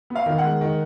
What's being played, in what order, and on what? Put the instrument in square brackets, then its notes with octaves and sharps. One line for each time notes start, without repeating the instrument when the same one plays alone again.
[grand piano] B3
F5
D#3
F#5
G#3
D#3